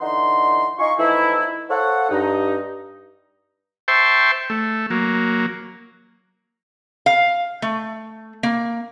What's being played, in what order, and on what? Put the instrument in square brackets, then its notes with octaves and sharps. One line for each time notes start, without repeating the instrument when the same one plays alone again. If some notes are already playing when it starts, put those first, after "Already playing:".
[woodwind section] D3 E3 D#4 F#5 C6
D#4 F4 D#5 G#5 C6 C#6
E3 F3 A3 D#4 E4
A4 C5 C#5 F5 F#5
G2 D#4
[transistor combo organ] C5 E5 G5 A5 C6 C#6
A3
F#3 A#3
[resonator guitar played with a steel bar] F5
A3
A#3